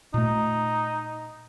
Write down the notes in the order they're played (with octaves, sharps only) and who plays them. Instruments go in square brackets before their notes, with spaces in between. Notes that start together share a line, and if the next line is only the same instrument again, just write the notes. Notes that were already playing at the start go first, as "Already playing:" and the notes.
[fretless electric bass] A#2 A3 [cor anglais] D#4